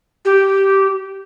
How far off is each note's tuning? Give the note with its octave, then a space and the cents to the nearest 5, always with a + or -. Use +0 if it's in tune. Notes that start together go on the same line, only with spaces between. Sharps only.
G4 -10